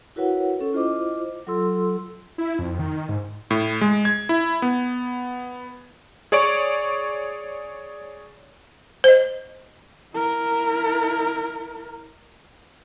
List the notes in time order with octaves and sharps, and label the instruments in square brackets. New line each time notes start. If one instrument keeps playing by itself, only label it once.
[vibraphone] E4 F#4 A#4 B4 C#5 F#5
C#4 A4
E4 F4 C5 D#5 D6
F#3 F4 A4 C6 E6
[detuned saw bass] E4
F2
D#3
G#2
[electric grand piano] A2
G#3
G#6
E4
B3
G#4 C#5 D5 C#6 D7
[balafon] C5 D#5
[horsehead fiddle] E4 A#4